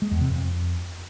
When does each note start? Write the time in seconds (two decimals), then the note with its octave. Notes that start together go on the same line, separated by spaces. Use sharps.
0.02 G#3
0.11 E2
0.21 C3
0.30 F2